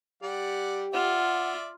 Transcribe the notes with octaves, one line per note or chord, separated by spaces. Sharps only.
G3 G4 D5 F#5
F4 D5 E5 F#5